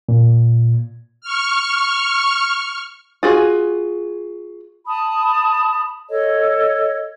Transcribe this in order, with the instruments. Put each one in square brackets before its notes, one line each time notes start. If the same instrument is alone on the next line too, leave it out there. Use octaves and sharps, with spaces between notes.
[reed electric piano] A#2
[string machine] C#6 F6
[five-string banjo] F4 F#4 G#4
[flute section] A5 B5 D#6
A4 C#5 D#5